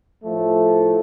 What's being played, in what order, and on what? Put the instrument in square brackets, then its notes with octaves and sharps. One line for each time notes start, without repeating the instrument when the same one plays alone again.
[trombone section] A2 F3 A3